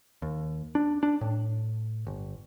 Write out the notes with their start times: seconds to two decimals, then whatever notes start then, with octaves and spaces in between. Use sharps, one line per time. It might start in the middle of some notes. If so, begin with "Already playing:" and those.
0.22 D#2
0.75 D4
1.03 D4
1.21 A2
2.07 G1